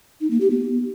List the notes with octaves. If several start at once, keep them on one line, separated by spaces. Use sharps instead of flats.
D#4
A#3
G4
B3